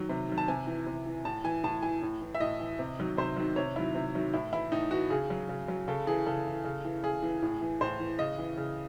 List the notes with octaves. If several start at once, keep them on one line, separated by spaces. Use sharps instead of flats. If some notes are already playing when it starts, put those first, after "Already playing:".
Already playing: D#3 F#3
C3
D#3 F#3
A5
C3 G#5
E3
C3
E3
A2 A5
E3 G#5
A2 A5
E3 G#5
A2
E3
E5
A2 D#5
E3
C3
D#3 F#3
C3 C5
D#3 F#3
C3 C#5
D#3 F#3 E4
C3
D#3 F#3
A2 E4
E3 E4
A2 D#4
E3 F#4
C#3 G#4
F#3
C#3
F#3
C#3 A4
E3 G#4
C#3 A4
E3
C#3
E3
C#3 G#4
E3
A2
E3
A2 C5
E3
C#3 D#5
E3
C#3